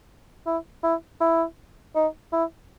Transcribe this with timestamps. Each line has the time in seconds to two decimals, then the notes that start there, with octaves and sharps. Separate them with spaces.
0.46 E4
0.83 E4
1.21 E4
1.96 D#4
2.33 E4